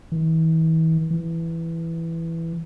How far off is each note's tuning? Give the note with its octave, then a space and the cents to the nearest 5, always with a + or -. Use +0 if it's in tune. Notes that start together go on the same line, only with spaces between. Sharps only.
E3 -40
E3 +5